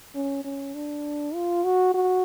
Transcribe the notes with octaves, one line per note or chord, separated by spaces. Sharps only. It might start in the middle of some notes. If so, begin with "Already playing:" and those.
C#4
C#4
D4
F4
F#4
F#4